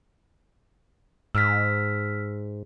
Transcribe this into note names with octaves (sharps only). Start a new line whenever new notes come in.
G#2 E6 F6 B6